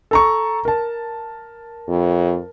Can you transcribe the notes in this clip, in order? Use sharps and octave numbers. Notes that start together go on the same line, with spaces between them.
A4 A#5 C#6
A#4 A5
F2